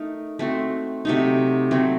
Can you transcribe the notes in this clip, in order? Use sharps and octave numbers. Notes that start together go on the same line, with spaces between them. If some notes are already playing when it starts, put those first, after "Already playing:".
Already playing: A3 D#4 A#4
A3 C4 F#4
C3 F#3 A3 D#4
F#3 A3 C4